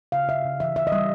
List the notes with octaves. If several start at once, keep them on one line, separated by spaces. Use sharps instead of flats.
C#3 F5
C#3 E5
C#3
E3 E5
C#3 E5
D#5
G3 E5